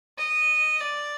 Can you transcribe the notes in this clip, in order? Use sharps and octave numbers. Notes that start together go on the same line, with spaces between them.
D#5
D5